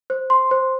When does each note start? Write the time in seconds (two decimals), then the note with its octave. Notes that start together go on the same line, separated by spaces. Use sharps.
0.10 C5
0.30 C6
0.51 C5